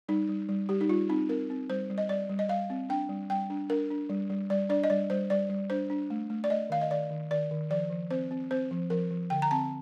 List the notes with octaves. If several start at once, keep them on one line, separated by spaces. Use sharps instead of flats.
G3 D#4
G3
G3
G3 G4
D#4
G3 F4
C4 D#4
C4 A#4
C4
G3 C5
G3
D#5
G3 D5
G3
D#5
G3 F5
C4
D4 G5
G3
G3 G5
D4
D4 A#4
D4
G3
G3
G3 D5
D4 D5
D#5
G3 D5
G3 C5
G3 D5
G3
D4 C5
D4
A3
A3
D5
A3 D#5
D#3 F5
D#5
D#3 D5
D#3
D#3 D5
D#3
F3 D5
F3
C4 C5
C4
C4 C5
F3
F3 A#4
F3
D3 G5
A#5
C4 A5